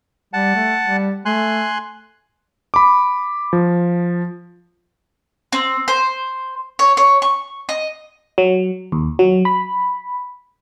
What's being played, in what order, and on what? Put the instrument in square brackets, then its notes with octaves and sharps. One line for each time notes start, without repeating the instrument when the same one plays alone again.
[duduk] G3 [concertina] F#5 A5
[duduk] A3
G3
[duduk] A3 [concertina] G#5 C6 F#6
[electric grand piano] B5 D6
F3
[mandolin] C4
C5
C#5
C#5
C#6
D#5
[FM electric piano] F#3
D#2
F#3
B5